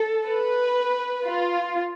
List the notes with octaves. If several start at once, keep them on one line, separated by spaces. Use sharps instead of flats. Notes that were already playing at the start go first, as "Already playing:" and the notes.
Already playing: A4
B4
F4